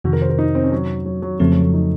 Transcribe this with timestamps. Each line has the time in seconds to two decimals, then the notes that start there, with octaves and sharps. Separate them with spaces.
0.04 F2 C3 D#3 F#4
0.13 A#4
0.22 C5
0.30 A#4
0.39 D#4
0.55 C4
0.64 C#4
0.72 F#3
1.06 F#3
1.22 F#3
1.40 F2 C#3 F3 A3 C4
1.51 F#3
1.62 A3
1.74 D#4